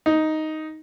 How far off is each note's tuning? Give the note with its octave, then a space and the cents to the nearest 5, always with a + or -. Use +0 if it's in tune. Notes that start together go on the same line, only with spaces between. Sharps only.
D#4 +5